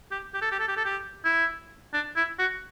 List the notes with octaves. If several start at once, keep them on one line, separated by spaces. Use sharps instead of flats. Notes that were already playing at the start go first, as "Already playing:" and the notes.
G4
G4
A4
G4
A4
G4
A4
G4
E4
D4
E4
F#4